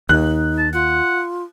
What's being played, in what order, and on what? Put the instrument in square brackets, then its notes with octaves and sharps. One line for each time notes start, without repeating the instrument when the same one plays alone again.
[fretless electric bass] D#2 [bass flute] D#4 [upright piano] F#6
[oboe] A5
[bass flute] F4 [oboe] F#5